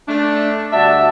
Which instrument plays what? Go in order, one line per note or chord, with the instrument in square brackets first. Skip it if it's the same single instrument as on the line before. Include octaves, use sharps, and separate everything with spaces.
[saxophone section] A3 D4
[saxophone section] D2 G3 E5 [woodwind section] F#4 D5 A5